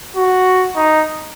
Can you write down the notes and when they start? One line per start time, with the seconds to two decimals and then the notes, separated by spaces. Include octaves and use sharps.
0.17 F#4
0.76 D#4